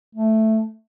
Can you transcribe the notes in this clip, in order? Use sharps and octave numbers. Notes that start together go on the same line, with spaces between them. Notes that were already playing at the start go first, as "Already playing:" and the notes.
A3